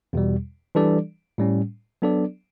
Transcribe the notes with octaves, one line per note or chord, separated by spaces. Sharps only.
E2 B2 G3
E3 G3 D4 A4 D5
A2 G3 C#4
F#3 B3 D4 A4 D5